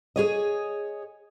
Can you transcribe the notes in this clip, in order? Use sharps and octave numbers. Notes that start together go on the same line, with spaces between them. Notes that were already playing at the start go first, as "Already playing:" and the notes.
G#4 C#5 D#5